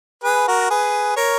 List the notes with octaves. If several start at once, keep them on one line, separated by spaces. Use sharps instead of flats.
G#4 B4
F#4 A#4
G#4 B4
A#4 C#5